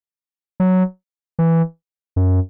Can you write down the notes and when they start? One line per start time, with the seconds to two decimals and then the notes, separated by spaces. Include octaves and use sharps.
0.60 F#3
1.39 E3
2.16 F#2